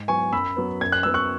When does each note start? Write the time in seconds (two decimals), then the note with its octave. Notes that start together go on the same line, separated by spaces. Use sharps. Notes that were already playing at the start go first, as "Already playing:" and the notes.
Already playing: G#2
0.08 F#3 B3 G#5 C#6
0.33 F#2 B5 E6
0.57 F#3 B3
0.81 F#2 G#6
0.92 F#6
1.03 F#3 B3 E6
1.14 C#6 F#6